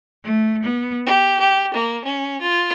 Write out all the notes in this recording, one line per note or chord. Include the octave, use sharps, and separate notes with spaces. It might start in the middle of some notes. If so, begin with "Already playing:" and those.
A3
B3
G4
G4
A#3
C#4
F4